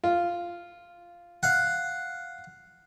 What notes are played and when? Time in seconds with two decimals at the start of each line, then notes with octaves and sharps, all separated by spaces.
0.04 F4
1.43 F5 F#5